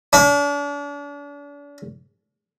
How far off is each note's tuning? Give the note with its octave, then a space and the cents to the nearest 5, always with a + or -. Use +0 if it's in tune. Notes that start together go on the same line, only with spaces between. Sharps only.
D4 -40